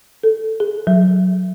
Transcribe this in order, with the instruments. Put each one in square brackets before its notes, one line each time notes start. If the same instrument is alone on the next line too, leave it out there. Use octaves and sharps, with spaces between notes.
[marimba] A4
G#4
F#3